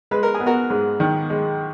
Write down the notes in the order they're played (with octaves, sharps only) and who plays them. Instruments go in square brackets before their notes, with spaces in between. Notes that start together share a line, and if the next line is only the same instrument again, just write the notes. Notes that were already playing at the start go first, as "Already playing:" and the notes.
[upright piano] G#3 [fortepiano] B4
[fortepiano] A#4
G#4
[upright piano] B3
[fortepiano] F#4 A#4
[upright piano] G#2
D#3
G#3